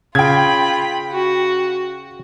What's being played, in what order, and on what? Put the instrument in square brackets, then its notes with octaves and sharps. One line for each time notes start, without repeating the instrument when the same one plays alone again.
[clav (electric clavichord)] C#3 [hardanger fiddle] F4 B5 [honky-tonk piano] G5 G#6
[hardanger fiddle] F#4